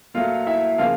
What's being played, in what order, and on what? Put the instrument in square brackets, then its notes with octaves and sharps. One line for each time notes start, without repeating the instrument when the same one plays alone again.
[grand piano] A#2 F#3 A3 F4 F5
E4 E5
C#3 F3 A#3 F4 F5